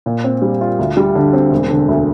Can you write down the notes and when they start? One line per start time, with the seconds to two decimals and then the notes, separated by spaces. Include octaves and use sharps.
0.06 A#2
0.24 C4
0.42 G3
0.61 F4
0.79 D2
0.97 G3
1.15 D3
1.33 C4
1.51 E1
1.70 D3
1.88 D2